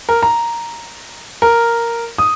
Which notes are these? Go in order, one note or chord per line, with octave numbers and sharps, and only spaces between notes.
A#4
A#5
A#4
D#6